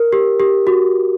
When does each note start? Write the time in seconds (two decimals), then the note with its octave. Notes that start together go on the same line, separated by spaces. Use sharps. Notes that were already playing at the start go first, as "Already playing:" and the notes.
Already playing: A#4
0.13 G4
0.40 G4
0.67 F#4